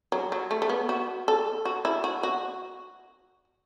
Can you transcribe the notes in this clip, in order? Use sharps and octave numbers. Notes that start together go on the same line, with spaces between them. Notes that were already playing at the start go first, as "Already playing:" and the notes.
F#3
F#3
A3
A3
B3
F#4
A4
F#4
E4
F#4
F#4